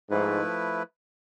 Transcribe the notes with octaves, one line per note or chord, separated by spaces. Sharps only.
G#2 F3 A3 E4 B4